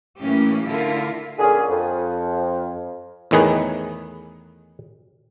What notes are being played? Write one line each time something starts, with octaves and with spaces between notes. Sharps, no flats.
A2 E3 A#3 C#4 G4
D3 E4 F4 A#4
A#2 D3 C#4 G#4
F2
E2 A2 D#3 G#4 B4